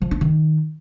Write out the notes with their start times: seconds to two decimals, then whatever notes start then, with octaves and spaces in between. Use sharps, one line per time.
0.01 F3
0.11 D4
0.21 D#3